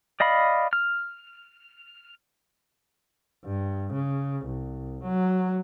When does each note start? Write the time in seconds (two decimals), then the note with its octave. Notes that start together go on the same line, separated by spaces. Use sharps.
0.20 D5 D#5 F5 B5
0.73 F6
3.45 G2
3.93 C#3
4.46 C2
5.04 F#3